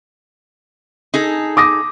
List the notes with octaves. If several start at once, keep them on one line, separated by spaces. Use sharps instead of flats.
D#4 G#4 A4
D6 D#6 A#6